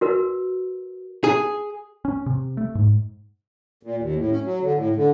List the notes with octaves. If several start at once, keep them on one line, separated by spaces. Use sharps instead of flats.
F#4 A#4 B4
G#4
C#4
C3
A3
G#2
A#2
D#2
A2
C#4
F#3
D3
A2
D3